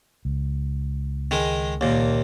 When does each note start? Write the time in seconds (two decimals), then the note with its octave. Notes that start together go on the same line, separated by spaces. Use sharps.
0.25 C#2
1.31 D#3 G#3
1.81 D#2 A#2